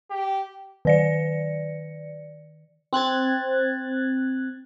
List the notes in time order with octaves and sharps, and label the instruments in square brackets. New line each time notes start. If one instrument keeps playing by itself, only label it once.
[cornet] G4
[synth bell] D#3 D5 C#7
[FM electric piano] C4 F#6 G#6 A6